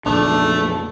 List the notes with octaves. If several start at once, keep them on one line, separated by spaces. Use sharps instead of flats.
B1 F2 A#2 C#3 A3 D4